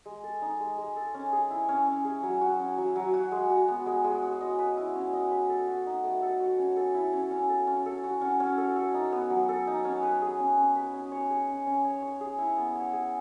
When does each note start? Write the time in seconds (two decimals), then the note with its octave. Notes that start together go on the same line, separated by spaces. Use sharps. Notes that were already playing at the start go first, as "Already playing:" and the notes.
0.06 G#3
0.23 A4
0.42 D#4
0.60 G#3
0.78 G#3
0.96 A4
1.14 C#4
1.32 G#4
1.50 E4
1.69 C#4
1.87 C#4
2.05 G#4
2.23 F#3
2.41 F#4
2.59 C#4
2.78 F#3
2.96 F#3
3.14 F#4
3.32 G#3
3.50 F#4
3.68 B3
3.86 G#3
4.04 G#3
4.23 F#4
4.41 D#5
4.59 B4
4.77 E4
4.95 C#4
5.13 D#5
5.31 B4
5.49 A4
5.68 F#4
5.86 D#4
6.04 A3
6.22 A4
6.40 F#4
6.59 C#4
6.76 A4
6.94 E4
7.13 C#4
7.31 C#4
7.49 A4
7.67 C#4
7.86 A4
8.04 F#4
8.22 C#4
8.40 C#4
8.58 A4
8.76 A4
8.94 D#4
9.12 B3
9.30 F#3
9.49 A4
9.67 D#4
9.85 C#4
10.03 B4
10.22 G#4
10.39 C#4
10.57 C#4
10.76 B4
10.94 C#4
11.12 C#5
11.30 G#4
11.48 C#4
11.66 C#4
11.84 C#5
12.02 C#5
12.21 G#4
12.38 E4
12.57 B3
12.75 C#5
12.93 G#4